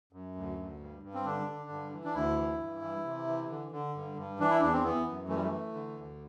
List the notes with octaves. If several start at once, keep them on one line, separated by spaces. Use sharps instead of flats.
F#2
D2
D2
G2
G2
C4
D3 D4
D3
G2
E3
D4
D2 E4
E3
G2
E3
C3
E3
D3
D3
G2
G2
E3 D4
E4
E2 D4
C4
E3 B3
F#2
E3 A3
G3
A3
E3
D3
D2